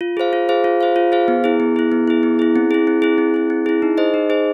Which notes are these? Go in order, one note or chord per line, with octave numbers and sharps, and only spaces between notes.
F4
G#4 C5 F5
F4
G#4 C5 F5
F4
G#4 C5 F5
F4
G#4 C5 F5
B3
E4 G#4
B3
E4 G#4
B3
E4 G#4
B3
E4 G#4
C4
E4 G#4
C4
E4 G#4
C4
E4 G#4
C4
E4 G#4
D#4
G#4 C5 D#5
D#4
G#4 C5 D#5